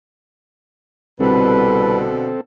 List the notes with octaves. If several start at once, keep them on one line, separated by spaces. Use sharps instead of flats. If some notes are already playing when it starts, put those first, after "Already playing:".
C2 B2 D3 C4 A4 B4